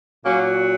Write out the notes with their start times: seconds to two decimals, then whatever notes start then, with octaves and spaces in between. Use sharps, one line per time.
0.25 A#2 F#3 A#3 C#4